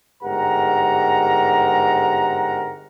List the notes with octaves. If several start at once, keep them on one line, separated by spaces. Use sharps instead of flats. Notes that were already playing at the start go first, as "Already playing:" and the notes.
G1 G#2 G4 A#4 F#5 A#5